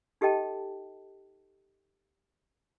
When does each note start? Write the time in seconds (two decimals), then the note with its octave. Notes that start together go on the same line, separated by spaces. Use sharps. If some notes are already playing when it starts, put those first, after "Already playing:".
0.21 D#4 G4 A4 D#5 G5 A5